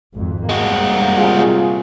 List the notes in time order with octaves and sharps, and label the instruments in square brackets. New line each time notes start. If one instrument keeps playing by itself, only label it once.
[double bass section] G#1 F2
[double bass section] G3 A#3 [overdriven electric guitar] G#3 F#4
[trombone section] C3 F4 G#4